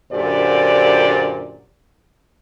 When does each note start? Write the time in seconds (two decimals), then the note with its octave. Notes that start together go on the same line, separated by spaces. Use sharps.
0.13 F#2 A#2 D3 G4 C5 D5